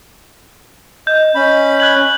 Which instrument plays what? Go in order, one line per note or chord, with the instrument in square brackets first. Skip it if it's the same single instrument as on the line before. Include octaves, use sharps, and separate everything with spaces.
[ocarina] D#5 [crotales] G6
[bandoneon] C#4 B5 [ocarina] D#5
[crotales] F#6 G#6 F#7